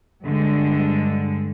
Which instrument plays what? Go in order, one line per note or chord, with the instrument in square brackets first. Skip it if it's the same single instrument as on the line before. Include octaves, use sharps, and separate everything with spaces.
[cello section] G2 D3 G#3